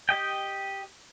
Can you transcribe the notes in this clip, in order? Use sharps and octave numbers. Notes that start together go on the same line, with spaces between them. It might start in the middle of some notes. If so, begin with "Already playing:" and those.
G4 D#5 G5